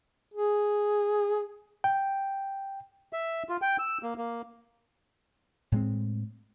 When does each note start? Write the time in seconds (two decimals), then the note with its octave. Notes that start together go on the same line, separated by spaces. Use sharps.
0.34 G#4
1.84 G5
3.13 E5
3.49 F4
3.62 G5
3.79 E6
4.03 A#3
4.17 A#3
5.72 A2 G#3 C4